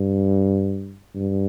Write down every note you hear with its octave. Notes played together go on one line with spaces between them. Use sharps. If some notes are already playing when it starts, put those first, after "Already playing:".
Already playing: G2
G2